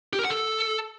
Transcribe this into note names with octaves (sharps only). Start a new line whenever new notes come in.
G4
A#4
F#5
A4